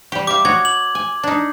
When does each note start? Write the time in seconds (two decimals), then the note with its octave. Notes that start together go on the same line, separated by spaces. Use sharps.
0.12 G3 G4
0.27 G4 E5 F5 D6
0.45 F#4 C#5 D#5 G#6
0.65 F#7
0.95 G#5
1.23 D4 D#4